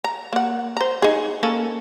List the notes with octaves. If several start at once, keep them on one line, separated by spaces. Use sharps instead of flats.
A#5
A#3 F#5
C5 A#5
D#4 G#4
A#3 C#4 A4